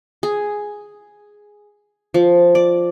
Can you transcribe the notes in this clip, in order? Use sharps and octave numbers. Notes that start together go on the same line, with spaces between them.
G#4
F3
D5